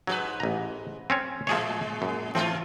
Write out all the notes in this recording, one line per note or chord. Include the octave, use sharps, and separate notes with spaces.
G#2 F#3 F#4 B4
A1 A#5
C4 C#4 C#5
A2 F3 G#3 G#4 C#5
F#2
A2 E3 A3 C4 F4